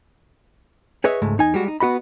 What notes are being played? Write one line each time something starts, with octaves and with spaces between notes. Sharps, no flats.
G#4 B4 C#5 D#5 E5
C#2 G#2 G#3 A3
E2 D#4 G#5
G3 G#3 F#4
D#4
B3 F#4 D#5 B5